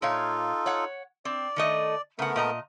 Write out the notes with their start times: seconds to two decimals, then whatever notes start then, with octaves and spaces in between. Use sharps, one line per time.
0.02 A#2 D#4 F4 A4 C#5 F5
0.66 C#5 F#5
1.25 C4 D5
1.56 D#3 A3 D#5
2.19 C#3 A3 B3 A#4 F#5
2.36 A#2 D#5 A#5